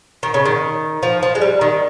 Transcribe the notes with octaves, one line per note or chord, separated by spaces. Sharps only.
D#3
C#3
D#3
F3
F3
G#3
G3
D#3